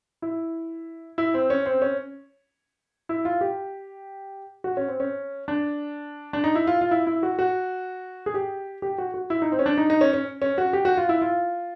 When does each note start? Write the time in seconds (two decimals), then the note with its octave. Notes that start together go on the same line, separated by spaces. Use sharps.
0.22 E4
1.18 E4
1.34 C4
1.50 C#4
1.66 C4
1.82 C#4
3.09 E4
3.25 F4
3.41 G4
4.64 F#4
4.77 C#4
4.88 C4
5.00 C#4
5.48 D4
6.33 D4
6.44 D#4
6.55 E4
6.67 F4
6.81 F4
6.91 E4
7.07 E4
7.23 F#4
7.39 F#4
8.26 G#4
8.34 G4
8.82 G4
8.98 F#4
9.14 F#4
9.30 E4
9.42 D#4
9.52 C4
9.59 C#4
9.66 D4
9.78 D#4
9.90 D#4
10.01 C#4
10.13 C#4
10.42 C#4
10.58 F#4
10.73 G4
10.85 F#4
10.97 F4
11.09 E4
11.22 F4